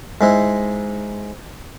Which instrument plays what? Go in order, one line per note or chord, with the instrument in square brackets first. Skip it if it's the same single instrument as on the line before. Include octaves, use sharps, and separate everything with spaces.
[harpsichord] G#2 G#3 E4